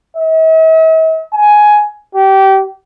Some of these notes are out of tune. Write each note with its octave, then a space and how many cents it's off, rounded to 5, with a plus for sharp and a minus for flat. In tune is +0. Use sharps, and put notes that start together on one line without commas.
E5 -45
G#5 +10
G4 -25